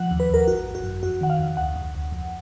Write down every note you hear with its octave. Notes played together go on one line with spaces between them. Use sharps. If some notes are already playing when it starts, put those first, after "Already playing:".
Already playing: F3 F#5
D#2
B4
D#2 A#4
G#1 F#4
G#1
F#4
F#2
F2 F#4
D#3 F#5
F5
F2
D2 F#5
D2
D2
F2